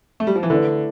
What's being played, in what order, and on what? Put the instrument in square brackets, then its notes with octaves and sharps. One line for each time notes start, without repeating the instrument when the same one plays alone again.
[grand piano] A3
G3
F3
E3
[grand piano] D3 [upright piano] A3 E4 B4 D5